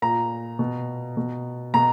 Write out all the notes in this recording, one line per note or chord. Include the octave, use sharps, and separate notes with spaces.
A#2 A#5
B2
B2
B2 A#5